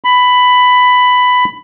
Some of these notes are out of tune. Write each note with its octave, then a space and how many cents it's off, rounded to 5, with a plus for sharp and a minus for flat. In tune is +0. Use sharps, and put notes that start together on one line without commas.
B5 +10